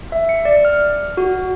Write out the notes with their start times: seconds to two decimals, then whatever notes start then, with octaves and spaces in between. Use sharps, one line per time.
0.12 E5
0.29 C#7
0.45 D5
0.65 F6
1.17 F#4